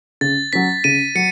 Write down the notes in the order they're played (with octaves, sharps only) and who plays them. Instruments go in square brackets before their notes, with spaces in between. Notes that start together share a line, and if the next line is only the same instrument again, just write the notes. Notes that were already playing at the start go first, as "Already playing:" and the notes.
[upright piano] C#3 [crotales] A6
[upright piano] F#3 C#4 [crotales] B6
[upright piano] C#3 [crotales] D#7
[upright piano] F#3 [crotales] C#7